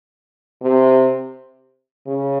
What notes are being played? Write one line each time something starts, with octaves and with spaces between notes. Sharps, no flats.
C3
C#3